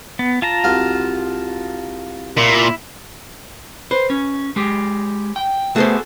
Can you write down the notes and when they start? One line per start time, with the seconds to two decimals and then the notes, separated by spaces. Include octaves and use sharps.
0.19 B3
0.42 F4 A5 A#5
0.64 C2 F#4 F5
2.38 A#2 E4
3.91 B4 C5
4.10 C#4
4.56 G#3 G4
5.36 G5
5.76 A3 B3 F#4 G#4 A4 C5